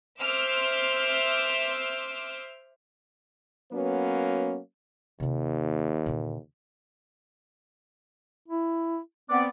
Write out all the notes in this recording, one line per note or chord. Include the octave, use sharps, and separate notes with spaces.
C5 E5 C6 D6 E6 F6
F#3 A#3 B3 C#4 F#4 B4
D#2 C3 F4
A#2 D3
E4
B3 C4 D5